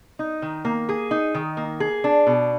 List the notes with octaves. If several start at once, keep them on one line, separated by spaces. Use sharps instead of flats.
D#4
D#3
A#3
G#4
D#4
D#3
A#3
G#4
D4
B2